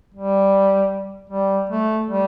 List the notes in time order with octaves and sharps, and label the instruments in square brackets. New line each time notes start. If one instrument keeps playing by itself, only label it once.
[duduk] G3
G3
A3
G3